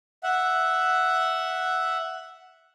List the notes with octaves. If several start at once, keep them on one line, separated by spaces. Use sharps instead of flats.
E5 F#5